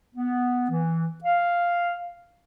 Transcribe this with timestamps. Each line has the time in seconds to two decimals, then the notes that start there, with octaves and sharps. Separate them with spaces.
0.15 B3
0.69 E3
1.23 F5